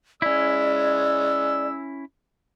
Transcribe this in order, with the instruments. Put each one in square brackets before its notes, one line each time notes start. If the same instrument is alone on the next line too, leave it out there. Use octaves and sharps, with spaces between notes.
[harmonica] G#3 E6 [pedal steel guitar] C#4 E4 [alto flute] D5